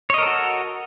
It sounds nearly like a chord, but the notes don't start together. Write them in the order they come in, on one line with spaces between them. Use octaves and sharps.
C#5 D#5 A#4 A4 F#4